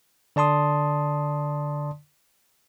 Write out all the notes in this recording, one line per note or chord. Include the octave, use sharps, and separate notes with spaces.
D3 D5 A5 C6 D#6